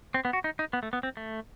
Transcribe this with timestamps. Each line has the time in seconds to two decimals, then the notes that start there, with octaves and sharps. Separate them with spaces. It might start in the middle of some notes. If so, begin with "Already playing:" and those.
0.14 C4
0.25 B3
0.33 F#4
0.44 D#4
0.59 D#4
0.73 B3
0.83 A3
0.93 B3
1.03 C4
1.17 A3